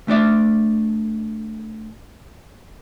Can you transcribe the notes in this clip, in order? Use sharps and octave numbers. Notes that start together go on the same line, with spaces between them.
A3 D4 D5 E5